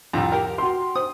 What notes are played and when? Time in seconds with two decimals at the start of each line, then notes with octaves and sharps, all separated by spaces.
0.13 C2 F2
0.32 G4 A#4
0.58 F#4 C6
0.96 C5 D#6